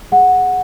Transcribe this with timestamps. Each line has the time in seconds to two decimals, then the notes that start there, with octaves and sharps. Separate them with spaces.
0.12 G#4 F#5